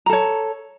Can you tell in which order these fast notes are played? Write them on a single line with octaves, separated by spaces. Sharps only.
A#5 A4 C#5